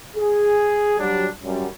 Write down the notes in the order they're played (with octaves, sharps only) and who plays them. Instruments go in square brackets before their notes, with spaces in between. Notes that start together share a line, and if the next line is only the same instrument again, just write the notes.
[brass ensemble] G#4
F#3 G3 D4
F#2 G3